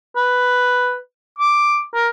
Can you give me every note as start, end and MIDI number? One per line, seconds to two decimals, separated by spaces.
0.16 0.97 71
1.38 1.80 86
1.94 2.08 70